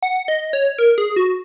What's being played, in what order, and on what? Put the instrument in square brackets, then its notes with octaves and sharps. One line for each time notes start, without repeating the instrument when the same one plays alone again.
[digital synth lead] F#5
D#5
C#5
A#4
G#4
F#4